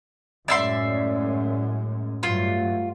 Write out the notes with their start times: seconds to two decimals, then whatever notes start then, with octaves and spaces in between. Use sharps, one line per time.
0.48 F#2 A2 G#3 D5 E5 C6
2.23 G2 F#3 A3 F4